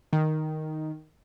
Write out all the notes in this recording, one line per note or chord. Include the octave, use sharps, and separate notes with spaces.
D#3